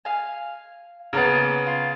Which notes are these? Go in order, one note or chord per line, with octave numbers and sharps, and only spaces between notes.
F5 G#5
C#3 A#3 B3 A#4 A5
F4